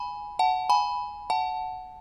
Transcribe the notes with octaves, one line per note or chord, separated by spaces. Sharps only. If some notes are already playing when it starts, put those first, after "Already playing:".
Already playing: G#5 B5
F#5 A5
G#5 B5
F#5 A5